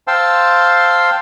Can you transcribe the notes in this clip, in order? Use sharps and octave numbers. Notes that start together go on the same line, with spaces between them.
C5 F5 G5 A5 C6 E6